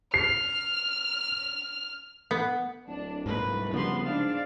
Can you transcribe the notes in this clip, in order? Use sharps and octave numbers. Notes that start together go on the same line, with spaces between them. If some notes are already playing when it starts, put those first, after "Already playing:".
F6 C7
B3
D1 D4
C2 G#2 A#3 B4
G2 C#3 F3 A#3 B3 C6
G#2 D4 F5